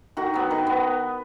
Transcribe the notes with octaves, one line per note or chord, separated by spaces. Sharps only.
D#3 F#4
F#3 B3
D#3
B3